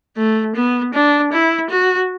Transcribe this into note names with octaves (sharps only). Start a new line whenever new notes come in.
A3
B3
D4
E4
F#4